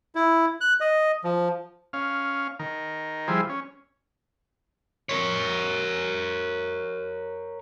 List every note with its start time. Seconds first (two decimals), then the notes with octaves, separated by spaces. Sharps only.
0.15 E4
0.61 F#6
0.80 D#5
1.24 F3
1.93 C#4 F5
2.59 D#3 A#4
3.28 F3 G3 E4 G#4 C5
3.49 C#4
5.09 A#4 C#5